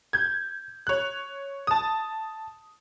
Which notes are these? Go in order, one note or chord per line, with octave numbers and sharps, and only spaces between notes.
G6 G#6
C#5 F#6
A5 D#6